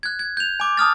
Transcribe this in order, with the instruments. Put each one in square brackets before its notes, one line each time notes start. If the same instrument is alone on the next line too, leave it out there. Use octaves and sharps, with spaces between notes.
[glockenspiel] F#6 G#6
G#6
G6 F7
G#5 D6
A5 D#6 F6 A6